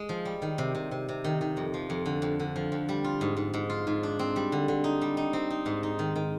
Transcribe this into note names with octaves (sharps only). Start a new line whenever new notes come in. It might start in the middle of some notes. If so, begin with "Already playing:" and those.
Already playing: G#3
F3
G3
D#3
C3
C3
C3
C3
D#3
D#3
F2
F3
F2
D3
F2
D3
F3
F2
G3
F4
G#2
G#2
G#2
F4
G#2
D4
C4
G3
D3
D3
D#4
G3
D#4
C4
D#4
G#2
D#4
D#3
D#3